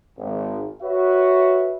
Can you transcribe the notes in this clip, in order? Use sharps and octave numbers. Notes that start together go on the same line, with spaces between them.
G#1
F#4 B4 C#5 E5